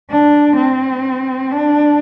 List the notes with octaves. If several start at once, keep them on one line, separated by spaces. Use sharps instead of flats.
D4
C4
D4